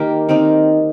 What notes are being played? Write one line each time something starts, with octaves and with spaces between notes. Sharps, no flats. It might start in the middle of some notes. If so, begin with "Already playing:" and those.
Already playing: D#3 A#3 G4 A#4
D#3 C4 D#4